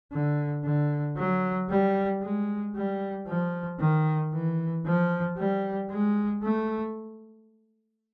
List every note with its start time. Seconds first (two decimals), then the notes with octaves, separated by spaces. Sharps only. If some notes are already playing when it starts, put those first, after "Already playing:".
0.12 D3
0.64 D3
1.17 F#3
1.69 G3
2.22 G#3
2.75 G3
3.28 F3
3.79 D#3
4.33 E3
4.85 F3
5.38 G3
5.90 G#3
6.43 A3